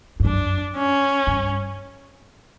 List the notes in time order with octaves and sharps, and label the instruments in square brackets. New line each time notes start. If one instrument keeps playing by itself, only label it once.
[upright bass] G2
[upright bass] F#2 [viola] D4
[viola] C#4
[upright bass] G2